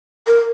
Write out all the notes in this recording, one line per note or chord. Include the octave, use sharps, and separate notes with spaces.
A#4